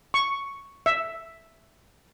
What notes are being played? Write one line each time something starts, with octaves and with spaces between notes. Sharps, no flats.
C#6
E5